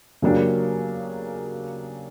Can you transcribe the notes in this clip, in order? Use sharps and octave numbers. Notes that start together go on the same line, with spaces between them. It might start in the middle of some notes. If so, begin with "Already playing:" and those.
C#3 F#3 A#3 D4 G4